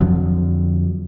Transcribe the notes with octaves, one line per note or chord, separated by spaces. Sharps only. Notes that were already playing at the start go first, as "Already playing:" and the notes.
F2 D3 F3 F#3